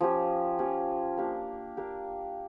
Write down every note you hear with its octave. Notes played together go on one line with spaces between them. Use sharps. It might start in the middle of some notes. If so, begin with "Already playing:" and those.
F3 C#4 G4
F3 C#4 G4
A#3 D4 G4
A#3 D4 G4